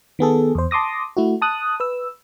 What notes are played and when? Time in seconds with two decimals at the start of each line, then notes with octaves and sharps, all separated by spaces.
0.19 D#3 B3 G#4 A4
0.55 E2 C5
0.71 A5 C6 D6 D#6 A#6
1.17 A3 E4 F#4
1.42 A5 D#6 F#6
1.80 B4 E6